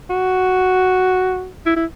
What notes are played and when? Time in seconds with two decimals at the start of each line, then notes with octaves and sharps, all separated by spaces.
0.10 F#4
1.66 E4
1.76 E4